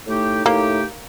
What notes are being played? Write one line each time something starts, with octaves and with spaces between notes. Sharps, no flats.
A2 A3 D#4 G4
A2 A3 A#3 D#4 G4